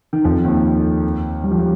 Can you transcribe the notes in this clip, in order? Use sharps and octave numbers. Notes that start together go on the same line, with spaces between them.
D#3
F2 F3
D#2 D#3
G3
F3
G3